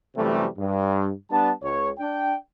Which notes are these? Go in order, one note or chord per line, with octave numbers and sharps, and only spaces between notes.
F#2 C3 E3 G3 A3
G2
G3 B3 D4 A5
C#2 C#5
D4 G5